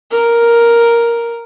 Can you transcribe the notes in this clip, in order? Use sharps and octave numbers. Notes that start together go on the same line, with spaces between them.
A#4